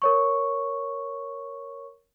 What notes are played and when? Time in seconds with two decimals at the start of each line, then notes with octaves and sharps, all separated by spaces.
0.02 A#4 C#5 C#6